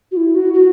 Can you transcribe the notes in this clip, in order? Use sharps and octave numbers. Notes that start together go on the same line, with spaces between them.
F#4
E4
F#4
F#4